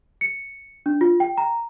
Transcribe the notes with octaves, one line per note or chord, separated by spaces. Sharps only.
C#7
D4
F4
G5
A#5